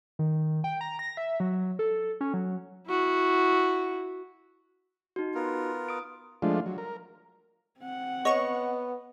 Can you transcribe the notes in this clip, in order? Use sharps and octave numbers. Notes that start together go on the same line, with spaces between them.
D#3
G5
A#5
A#6
E5
F#3
A4
C#4
F#3
E4 F#4
D#4 F#4
B3 F4 A#4
D#6 D7
F3 G#3 A3 D4 F4
F#3
A#4
C4 F#5
B3 C#5 D#5 C#6